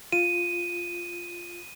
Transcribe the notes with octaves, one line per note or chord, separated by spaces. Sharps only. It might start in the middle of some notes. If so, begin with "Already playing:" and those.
F4 D#7